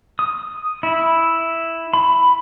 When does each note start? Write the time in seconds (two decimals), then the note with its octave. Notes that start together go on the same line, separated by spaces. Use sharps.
0.19 D#6
0.83 E4
1.94 B5